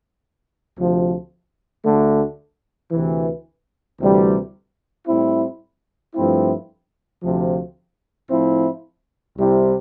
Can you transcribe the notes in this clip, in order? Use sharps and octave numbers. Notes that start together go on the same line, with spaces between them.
D2 C3 F3
D2 D3 A3
D2 C3 E3
D2 C3 E3 G3
A2 G3 C4 E4
G2 F3 A3 C4 E4
D2 C3 F3
A2 F3 C4 E4
C2 C3 G3 C4 E4